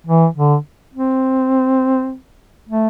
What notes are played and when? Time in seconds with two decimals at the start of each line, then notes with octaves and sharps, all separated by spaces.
0.07 E3
0.36 D3
0.93 C4
2.69 A3